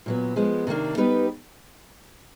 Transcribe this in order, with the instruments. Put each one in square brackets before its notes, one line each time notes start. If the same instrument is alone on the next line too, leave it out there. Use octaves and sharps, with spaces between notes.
[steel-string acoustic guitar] A#2 F#3 B3
F3 G#3 B3
C3 D#3 G3 A#3 D4
G3 B3 D#4 G4 B4